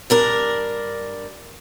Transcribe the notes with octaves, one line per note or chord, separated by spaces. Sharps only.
G2 D4 A#4